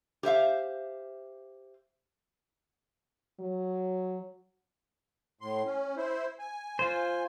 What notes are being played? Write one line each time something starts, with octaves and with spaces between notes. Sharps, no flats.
G4 C5 E5 F5
F#3
A2 C6
C#4
E4 C5
G#5
F4 C5